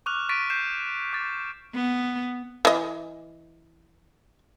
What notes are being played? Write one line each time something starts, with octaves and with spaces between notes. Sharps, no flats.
C#6 D6 F6 F#6 F7
C#6 A6 B6 D7 D#7
G6 C7 E7
D6 A6
B3
E3 D#5